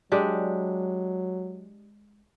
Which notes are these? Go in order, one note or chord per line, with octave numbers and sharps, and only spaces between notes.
F#3 G#3 D4 G4